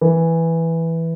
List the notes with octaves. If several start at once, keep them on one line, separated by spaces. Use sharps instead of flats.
E3